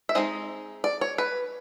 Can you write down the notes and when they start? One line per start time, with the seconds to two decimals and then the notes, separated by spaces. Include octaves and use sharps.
0.09 E5
0.15 G#3 C4 D#4 D#5
0.84 D5
1.01 C#5
1.18 B4